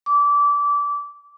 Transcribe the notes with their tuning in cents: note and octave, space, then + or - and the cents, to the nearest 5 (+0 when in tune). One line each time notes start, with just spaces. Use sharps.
D6 -25